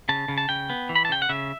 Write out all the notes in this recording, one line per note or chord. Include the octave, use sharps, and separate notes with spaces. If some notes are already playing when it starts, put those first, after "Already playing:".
C#3 A5
C#3
A5
C#3 G5
B3
E3
B5
A5
C#3 G5
F#5
C#3 E5